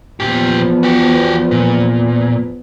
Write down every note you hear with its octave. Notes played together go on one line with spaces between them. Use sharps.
E2 A#2 F3 B3 G4
F#4 G4
A#2